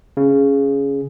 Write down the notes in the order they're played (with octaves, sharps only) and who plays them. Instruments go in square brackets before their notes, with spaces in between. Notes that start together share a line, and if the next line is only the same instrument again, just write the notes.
[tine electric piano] C#3